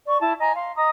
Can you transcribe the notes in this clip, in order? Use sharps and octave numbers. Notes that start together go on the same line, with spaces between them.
D5 C#6
E4 A5
D#5 G#5 A#5
F5 C6
D#5 A#5 D#6